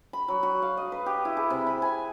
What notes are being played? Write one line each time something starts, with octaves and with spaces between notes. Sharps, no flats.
B5
F#3
F#4
F5
D#5
B4
G4
E4
G#4
C3
B5
G#5